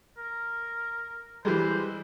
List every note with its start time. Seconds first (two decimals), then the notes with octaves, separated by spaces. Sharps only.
0.18 A#4
1.45 E3 G3 G#3 C5